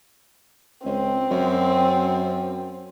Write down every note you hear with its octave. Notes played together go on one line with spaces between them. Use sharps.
C#2 C4
F#2